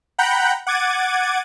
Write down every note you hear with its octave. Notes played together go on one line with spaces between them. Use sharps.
F#5 G5 A#5 B5 F#6 G6
F#5 D6 G#6 A6 D#7